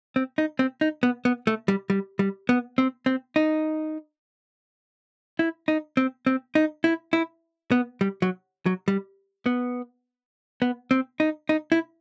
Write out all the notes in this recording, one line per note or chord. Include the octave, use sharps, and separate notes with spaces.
C4
D#4
C4
D#4
B3
B3
A3
G3
G3
G3
B3
C4
C4
D#4
E4
D#4
C4
C4
D#4
E4
E4
B3
G3
F#3
F#3
G3
B3
B3
C4
D#4
D#4
E4